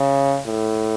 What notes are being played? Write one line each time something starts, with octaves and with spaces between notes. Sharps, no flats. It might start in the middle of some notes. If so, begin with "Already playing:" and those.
Already playing: C#3
A2